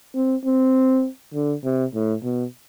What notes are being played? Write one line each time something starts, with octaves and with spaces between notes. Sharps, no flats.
C4
C4
D3
C3
A2
B2